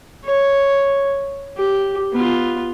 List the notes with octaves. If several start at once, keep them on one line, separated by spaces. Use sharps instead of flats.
C#5
G4
B3 F4